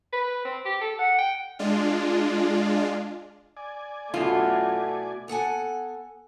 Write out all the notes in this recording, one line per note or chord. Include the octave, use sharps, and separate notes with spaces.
B4
C4
G4
A4
F#5
G5
G#3 D4 F4
D5 G#5
F#2 B2 A3 E4 F4 A4
B3 A4 F#5 G#5